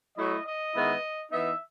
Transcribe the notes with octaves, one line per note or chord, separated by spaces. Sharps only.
F#3 A3 E4 D#5
D#5
D#3 G#3 B3 E4
E3 B3 D#4 E5